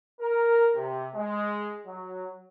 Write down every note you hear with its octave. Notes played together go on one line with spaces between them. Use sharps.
A#4
C3
G#3
F#3